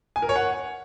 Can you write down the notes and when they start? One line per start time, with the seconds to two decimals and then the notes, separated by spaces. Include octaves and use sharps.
0.16 G#5
0.22 A#4
0.29 C#5
0.36 F#5